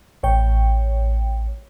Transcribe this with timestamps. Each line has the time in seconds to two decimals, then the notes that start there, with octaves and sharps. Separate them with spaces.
0.23 A1 C#5 G5